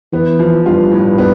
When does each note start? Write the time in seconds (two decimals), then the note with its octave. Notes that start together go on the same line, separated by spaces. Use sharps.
0.13 E3 B3
0.39 F3
0.66 G2 F4
0.91 A2
1.18 B3